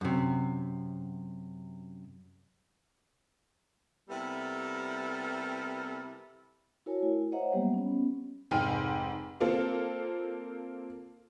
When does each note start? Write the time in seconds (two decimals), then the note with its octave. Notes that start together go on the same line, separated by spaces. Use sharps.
0.01 F#2 C3
4.10 C3 G3 B3 E4 A4 A#4
6.86 E4 F#4 A#4 C#5 G#5 A5
7.02 A3 E4
7.32 C5 C#5 D#5 E5 F#5 A#5
7.52 F#3 G3 A#3 B3 G4
7.74 B3 C#4
8.51 F1 G#2 G5 G#5 F6
9.40 A#3 C4 F4 A4